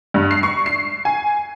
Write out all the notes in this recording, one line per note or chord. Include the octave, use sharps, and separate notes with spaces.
G2
C7
C#6
C7
G#5